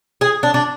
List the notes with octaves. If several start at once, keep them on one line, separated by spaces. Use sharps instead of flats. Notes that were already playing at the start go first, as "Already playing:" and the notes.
G#4
D4
D4